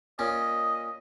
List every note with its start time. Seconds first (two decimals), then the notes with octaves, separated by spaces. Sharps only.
0.19 A#2 C#4 D#5